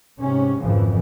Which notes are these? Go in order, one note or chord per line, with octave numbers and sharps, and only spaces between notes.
G#2 C3 C#4
G#1 F2 C#3 E3 F3